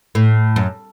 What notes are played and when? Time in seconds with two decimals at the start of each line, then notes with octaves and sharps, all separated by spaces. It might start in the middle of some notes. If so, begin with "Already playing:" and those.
0.15 A2
0.56 F#2